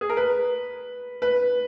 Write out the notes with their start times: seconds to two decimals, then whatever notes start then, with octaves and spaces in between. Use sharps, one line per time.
0.01 G#4
0.10 A#4
0.17 B4
1.22 B4